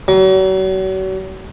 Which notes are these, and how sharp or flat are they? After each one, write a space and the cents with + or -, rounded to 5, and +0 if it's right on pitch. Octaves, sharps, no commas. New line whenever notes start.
F#3 +40